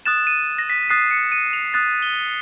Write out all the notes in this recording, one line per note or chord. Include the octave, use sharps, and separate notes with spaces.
D#6 F#6 A6 E7
D#7
A#6
B6
D#6 F#6 A6 C7
C#7
D#7
F7
D#6 F#6 A6
G7
G7